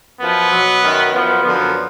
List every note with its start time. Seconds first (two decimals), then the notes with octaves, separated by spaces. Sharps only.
0.20 F#2 F3 B3
0.51 B2 F#3
0.82 F#2 D#3 F#3
1.13 F#2 F3 B3
1.43 F#2 D3 F3 B3